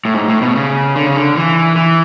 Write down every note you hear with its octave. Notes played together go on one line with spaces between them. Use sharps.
A2
G#2
A2
B2
C#3
D3
C#3
D3
E3
E3